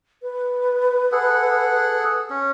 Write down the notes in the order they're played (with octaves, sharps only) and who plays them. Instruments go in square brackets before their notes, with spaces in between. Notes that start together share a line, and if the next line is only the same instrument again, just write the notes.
[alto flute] B4
[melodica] G#4 A4 F#5
C#4